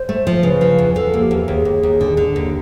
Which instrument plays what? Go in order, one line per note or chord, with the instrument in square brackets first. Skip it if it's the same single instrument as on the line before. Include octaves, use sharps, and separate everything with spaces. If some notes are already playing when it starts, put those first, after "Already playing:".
Already playing: [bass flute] C5
[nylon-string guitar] A3
F3
[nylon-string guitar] C#3 [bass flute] B4
[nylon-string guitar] F3
E2
[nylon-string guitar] F3 [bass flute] A4
[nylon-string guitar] A#3
[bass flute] G4
[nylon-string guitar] E2
[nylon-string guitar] D#2 [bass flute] G#4
[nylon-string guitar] D#2
D#2
D3
D3
D#2